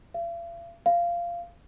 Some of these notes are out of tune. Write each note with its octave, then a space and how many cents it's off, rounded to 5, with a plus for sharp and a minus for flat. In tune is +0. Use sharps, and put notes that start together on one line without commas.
F5 -45
F5 -15